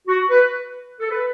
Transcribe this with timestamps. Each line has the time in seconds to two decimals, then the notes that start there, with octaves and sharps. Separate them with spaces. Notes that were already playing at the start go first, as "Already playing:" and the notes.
0.08 F#4
0.30 B4
1.00 A4
1.10 B4